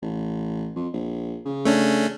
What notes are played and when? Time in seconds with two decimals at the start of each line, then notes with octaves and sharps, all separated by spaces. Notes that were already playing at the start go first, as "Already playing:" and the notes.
0.02 A1
0.76 F2
0.93 A#1
1.45 C#3
1.65 A3 C#4 D4